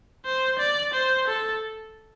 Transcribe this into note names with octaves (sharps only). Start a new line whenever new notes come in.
C5
D5
C5
A4